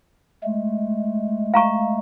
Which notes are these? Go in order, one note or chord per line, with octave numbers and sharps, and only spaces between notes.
G#3 A3
F5 A#5 C#6